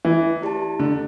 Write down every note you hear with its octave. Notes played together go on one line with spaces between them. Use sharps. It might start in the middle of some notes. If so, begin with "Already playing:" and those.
E3 A3
E4 G4 D5 A5
D3 A3